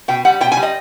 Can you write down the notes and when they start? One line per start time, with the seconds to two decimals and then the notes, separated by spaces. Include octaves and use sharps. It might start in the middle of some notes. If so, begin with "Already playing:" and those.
0.08 B2 G5
0.25 G3 F#5
0.41 B2 G5
0.52 G#5
0.57 G3
0.63 D#5